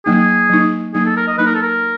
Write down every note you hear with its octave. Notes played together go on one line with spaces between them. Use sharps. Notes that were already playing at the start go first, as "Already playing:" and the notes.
F#3 A#3 D#4 G#4
F#3 A#3 D#4
F#3 A#3 D#4 G#4
A4
A#4
D#5
F#3 A#3 D#4 B4
A#4
A4
A#4